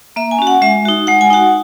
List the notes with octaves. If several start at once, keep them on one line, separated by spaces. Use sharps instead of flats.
A#3 E5
G#5
C#4 F#4
F#5
G#3 E5
D#4 F#4
G#3 F#5
G#5
D#4 F#4 F#5